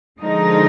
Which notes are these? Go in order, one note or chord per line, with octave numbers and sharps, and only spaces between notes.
D3 F3 G#3 D#4 A#4